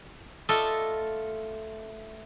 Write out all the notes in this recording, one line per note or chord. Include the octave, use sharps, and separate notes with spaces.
A3 F4 A4 D5 D#5 A5